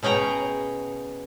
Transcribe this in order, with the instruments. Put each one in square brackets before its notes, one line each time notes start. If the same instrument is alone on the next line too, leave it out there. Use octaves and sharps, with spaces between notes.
[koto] B2 C#4 G#4 G5 A#5